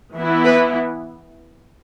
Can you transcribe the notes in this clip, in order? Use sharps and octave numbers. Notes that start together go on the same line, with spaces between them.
E3 B3 E4
B4